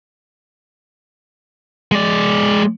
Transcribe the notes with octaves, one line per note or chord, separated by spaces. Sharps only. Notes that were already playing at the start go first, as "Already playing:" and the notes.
G#3 D5